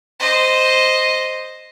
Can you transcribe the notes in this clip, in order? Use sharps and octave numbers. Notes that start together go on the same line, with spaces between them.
C5 D#5